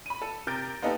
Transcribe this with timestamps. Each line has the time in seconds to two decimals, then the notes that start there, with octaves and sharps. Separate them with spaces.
0.06 B5 D#7
0.22 A4
0.47 C3 A#4 G6 A6 D7
0.82 A#3 B3 D#4 G4 A4 B4